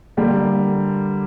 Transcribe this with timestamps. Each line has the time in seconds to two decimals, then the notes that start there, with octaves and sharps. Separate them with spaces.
0.17 D3 G3 A#3